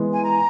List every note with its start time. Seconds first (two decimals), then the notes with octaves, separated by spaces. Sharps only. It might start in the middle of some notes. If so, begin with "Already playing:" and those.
Already playing: E3 G#3 B3
0.12 G#5
0.23 A#5